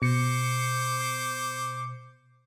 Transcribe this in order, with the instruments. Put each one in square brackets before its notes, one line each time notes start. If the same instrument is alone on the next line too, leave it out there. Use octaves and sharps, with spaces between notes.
[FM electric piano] B2 C#7 [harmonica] C5 D6